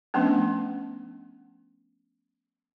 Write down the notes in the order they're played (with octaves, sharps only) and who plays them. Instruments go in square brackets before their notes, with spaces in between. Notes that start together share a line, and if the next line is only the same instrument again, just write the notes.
[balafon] F3 A3 B3 C#4 D4